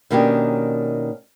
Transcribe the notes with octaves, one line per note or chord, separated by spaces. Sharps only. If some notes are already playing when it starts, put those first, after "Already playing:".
B2 D#3 A#3 C#4 D4 G4